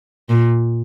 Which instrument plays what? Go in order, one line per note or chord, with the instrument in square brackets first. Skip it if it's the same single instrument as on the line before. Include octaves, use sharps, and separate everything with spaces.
[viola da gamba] A#2